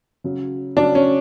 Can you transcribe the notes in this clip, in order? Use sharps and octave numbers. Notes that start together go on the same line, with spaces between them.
C#3 F#3
C#3 F#3 D4
C#4